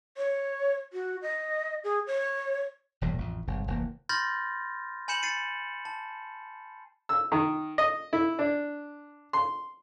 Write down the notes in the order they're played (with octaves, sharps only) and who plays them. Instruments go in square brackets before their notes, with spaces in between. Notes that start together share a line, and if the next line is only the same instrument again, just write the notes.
[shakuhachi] C#5
F#4
D#5
G#4
C#5
[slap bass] E1 E2 G2 A#2
A1 F2
G1 G#2 C3
F1 D2 E3 A#3
[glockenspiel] B5 C6 F6 G6 A6 A#6
G#5 B5 G6 C#7 E7 F#7
A6 C7 C#7 D#7
A5
[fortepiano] E6
D#3
D#5
E4
D4
C6